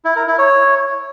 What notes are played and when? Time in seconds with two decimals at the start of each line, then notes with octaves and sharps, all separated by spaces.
0.05 E4
0.16 A#4
0.27 E4
0.38 C#5